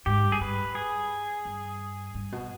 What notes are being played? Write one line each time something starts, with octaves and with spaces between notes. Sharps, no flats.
G#2 G4
G2
G#4
G2 B4
G#4
G2
G2
B2